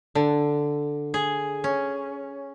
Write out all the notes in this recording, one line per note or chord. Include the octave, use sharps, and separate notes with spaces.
D3
G#4
C#4